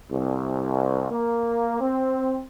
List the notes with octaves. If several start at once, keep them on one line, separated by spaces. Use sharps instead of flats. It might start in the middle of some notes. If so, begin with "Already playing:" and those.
C2
A#3
C4